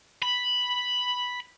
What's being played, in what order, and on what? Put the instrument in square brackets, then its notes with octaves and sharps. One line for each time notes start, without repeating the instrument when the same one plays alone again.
[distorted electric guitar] B5